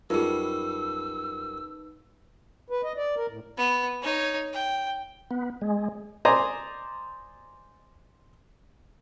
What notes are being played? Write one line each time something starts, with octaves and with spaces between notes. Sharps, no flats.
F#2 G3 D#4 F4 G#4 B4 E6
B4
D#5
D5
A#4
A2
B3
D#4 C#5
G5
B3
G#3
C5 D5 D#5 G#5 A#5